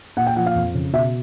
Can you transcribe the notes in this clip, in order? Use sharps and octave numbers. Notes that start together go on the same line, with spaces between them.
A#2 F#5
G5
F3 F#5
F5
F2
C#3
B2 E5